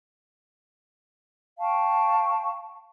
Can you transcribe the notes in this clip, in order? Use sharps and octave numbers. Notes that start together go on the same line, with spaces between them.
F5 G5 A5 C#6